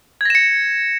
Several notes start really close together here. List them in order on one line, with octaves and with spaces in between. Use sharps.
G#6 A#6 E7 C#7